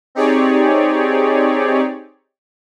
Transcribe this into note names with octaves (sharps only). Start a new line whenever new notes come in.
C4 D#4 G4 G#4 C#5 D5